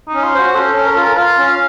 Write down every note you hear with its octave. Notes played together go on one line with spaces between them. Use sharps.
D#4
C#4
F4
F#4 C5
C#4 A4
C#4
A#4
F4 A4
A#4
F4 F5
C#4